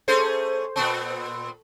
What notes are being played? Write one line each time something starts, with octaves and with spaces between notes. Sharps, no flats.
A3 C#4 G#4 A4 C5
A#2 B3 C4 A5 C#6